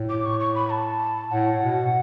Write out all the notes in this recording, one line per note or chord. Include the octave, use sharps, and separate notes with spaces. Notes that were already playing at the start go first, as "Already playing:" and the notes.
Already playing: A2
D6
C#6
C#6
B5
A5
A2 F#5
B2